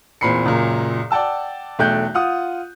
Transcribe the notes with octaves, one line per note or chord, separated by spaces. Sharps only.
E2 A#2 C4 B5 C7 C#7
C#2 F#2 A#2
D5 F#5 G5 A5 E6
B1 E2 A3 G5 F#6 G6
F4 F#5 D#6